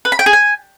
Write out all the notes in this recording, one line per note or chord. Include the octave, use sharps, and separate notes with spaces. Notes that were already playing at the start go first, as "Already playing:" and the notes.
B4
B5
G5
G#4
G#5